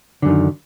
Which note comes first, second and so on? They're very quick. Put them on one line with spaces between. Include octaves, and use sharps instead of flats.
D3 F#2 D#3